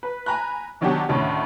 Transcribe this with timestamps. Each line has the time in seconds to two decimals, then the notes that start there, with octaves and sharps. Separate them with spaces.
0.03 B4
0.26 G#5 A#5 B5 F#6
0.81 B2 D#3 F#3 D4 F#4 G4
1.09 D2 A2 D3 D#3 C#4